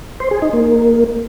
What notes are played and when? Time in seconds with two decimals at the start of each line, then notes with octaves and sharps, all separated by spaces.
0.20 C5
0.31 G#4
0.42 D#4
0.53 A#3